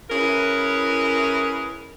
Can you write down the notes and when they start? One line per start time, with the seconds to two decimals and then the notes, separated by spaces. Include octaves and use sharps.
0.10 C#4 E4 G#4 A#4 B4